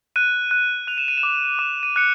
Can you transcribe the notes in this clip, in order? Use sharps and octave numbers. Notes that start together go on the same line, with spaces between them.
F#6 D#7
F#6
F#6 F7
E7
D#7
E7
D6
D6 E7
D#7
F#6 C#7